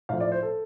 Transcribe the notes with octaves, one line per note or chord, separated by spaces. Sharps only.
A2 F3 F5
D5
C5
A4